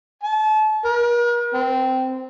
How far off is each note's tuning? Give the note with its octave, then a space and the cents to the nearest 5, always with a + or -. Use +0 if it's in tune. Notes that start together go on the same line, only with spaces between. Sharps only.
A5 -35
A#4 +45
C4 -15